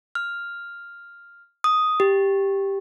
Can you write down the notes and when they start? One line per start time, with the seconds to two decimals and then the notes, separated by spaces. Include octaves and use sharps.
0.15 F6
1.64 D#6
2.00 G4